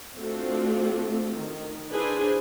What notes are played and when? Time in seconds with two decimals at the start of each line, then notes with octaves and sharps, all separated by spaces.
0.17 A3 C4 D4 F4 F#4
1.35 D#3
1.91 D4 E4 G#4 B4 C5 G#5